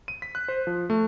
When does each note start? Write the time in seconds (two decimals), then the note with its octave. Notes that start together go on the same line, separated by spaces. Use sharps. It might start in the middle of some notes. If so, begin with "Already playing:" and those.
0.08 D#7
0.22 B6
0.35 F#6
0.48 C5
0.67 F3
0.90 A3